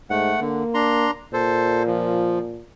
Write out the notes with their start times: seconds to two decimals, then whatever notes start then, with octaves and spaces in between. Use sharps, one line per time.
0.10 G#2 A3 F#5
0.40 D3 A#3
0.74 D4 A#5 C6
1.33 A#2 A4 C5
1.87 F3